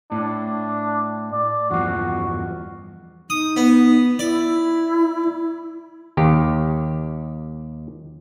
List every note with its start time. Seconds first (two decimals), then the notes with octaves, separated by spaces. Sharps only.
0.12 A2 D4
1.32 D5
1.71 E2 G2 F3 F#4
3.30 D#4 D#6
3.56 B3
4.19 E4 D5
6.17 D#2 D#3 G4